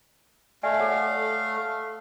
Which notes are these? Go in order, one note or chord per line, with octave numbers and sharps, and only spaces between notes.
A3 D5 E5 F5 G#5
A4 C#5 F#5